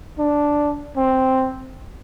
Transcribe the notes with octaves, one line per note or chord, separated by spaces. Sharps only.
D4
C4